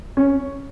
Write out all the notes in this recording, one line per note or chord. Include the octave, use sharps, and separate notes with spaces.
C#4